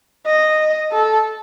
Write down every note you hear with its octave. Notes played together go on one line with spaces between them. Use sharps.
D#5
A4